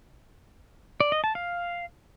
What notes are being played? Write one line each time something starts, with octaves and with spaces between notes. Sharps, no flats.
D5
D#5
A5
F5